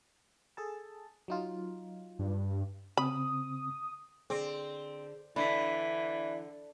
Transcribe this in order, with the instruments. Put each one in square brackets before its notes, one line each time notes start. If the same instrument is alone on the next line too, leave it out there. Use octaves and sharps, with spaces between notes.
[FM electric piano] G#4 A4 A5
F#3 D#4 F4
[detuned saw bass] G2
[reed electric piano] C#3 C4 [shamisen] B5 [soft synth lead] D#6
[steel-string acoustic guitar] D3 [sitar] C4 [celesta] G#4
[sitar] D3 [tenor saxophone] E3 [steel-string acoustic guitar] D4 [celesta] B5 B6